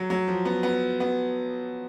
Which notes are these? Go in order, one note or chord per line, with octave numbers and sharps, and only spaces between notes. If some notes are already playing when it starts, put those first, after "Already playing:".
Already playing: F#3
F#3
F3
B3
B3
B3